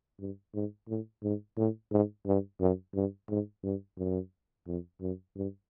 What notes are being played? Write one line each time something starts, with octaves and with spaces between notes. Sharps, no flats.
G2
G#2
A2
G#2
A2
G#2
G2
F#2
G2
G#2
G2
F#2
F2
F#2
G2